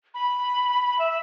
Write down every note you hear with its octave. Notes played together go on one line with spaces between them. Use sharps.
B5
E5